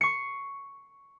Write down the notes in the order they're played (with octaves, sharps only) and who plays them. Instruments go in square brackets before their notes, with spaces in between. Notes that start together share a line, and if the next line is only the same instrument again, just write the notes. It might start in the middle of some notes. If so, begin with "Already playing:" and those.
[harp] C#6 C7 C#7